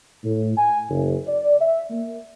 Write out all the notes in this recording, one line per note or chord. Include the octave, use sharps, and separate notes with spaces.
A2
G#5
F#1
D5
E5
A#3